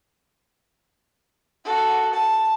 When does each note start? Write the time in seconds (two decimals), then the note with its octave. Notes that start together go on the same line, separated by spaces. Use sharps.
1.65 F#4 A4
2.13 A5